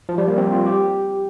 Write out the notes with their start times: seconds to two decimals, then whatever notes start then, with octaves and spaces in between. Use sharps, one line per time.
0.09 F3
0.18 G3
0.27 A#3
0.38 C4
0.52 F4
0.66 G4